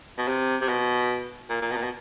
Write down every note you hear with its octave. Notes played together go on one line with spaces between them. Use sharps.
B2
C3
C3
B2
A#2
A#2
B2
A#2
B2